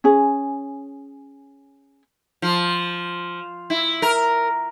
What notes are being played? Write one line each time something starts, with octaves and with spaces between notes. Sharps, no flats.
C#4 G#4
F3
E4
A#4